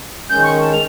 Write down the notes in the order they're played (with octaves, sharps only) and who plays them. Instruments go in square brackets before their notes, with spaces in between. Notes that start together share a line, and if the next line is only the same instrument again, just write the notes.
[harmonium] D#3 G#3 C#4 [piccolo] G6
[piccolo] C#6
A5
F7